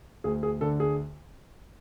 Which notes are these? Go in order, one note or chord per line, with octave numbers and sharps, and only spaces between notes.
D2 G#4
G#4
D3 A4
G#4